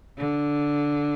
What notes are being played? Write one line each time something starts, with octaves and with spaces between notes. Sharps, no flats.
D3